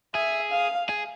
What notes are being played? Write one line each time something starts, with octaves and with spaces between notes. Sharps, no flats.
G#4 E5
F5
G#4